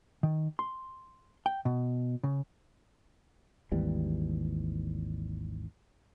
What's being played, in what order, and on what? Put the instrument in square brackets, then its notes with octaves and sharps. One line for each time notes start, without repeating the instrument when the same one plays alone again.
[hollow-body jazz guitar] D#3
C6
G5
B2
C#3
[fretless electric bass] G#1 D#2 E3 G3